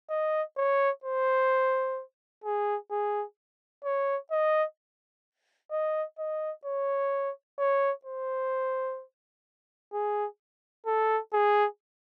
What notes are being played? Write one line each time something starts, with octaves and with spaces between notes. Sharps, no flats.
D#5
C#5
C5
G#4
G#4
C#5
D#5
D#5
D#5
C#5
C#5
C5
G#4
A4
G#4